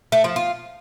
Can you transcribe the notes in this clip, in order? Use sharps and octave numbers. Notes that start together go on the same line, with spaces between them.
A3
F3
F4